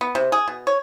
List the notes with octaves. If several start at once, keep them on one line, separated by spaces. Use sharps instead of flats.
B3
C3
G#4
B2
C#5